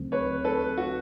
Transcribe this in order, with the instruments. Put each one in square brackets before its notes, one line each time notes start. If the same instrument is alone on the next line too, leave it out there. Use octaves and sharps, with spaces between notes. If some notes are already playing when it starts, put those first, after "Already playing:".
Already playing: [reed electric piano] D2 C#3 F#3 A3 C4
[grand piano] B4 C#5
A4 B4
F#4